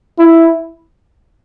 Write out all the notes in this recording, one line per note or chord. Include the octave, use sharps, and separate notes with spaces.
E4